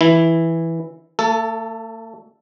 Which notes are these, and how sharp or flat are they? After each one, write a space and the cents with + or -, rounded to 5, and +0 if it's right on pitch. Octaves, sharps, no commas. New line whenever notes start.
E3 +0 E4 +0
A3 +40 A4 +0